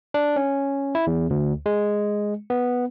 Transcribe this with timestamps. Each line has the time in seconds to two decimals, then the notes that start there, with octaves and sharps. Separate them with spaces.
0.14 D4
0.36 C#4
0.95 E4
1.07 E2
1.30 D2
1.66 G#3
2.50 B3